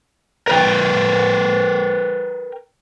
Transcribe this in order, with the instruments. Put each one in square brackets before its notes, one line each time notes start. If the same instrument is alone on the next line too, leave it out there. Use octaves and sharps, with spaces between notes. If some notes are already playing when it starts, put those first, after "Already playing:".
[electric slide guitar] A#4 B4 G5